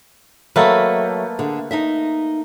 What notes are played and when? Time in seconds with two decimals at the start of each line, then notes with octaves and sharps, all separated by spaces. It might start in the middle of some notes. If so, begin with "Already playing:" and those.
0.56 F#3 A3 A#3 B4 D#5
1.39 D3 G#4
1.71 D#4 D#5 E5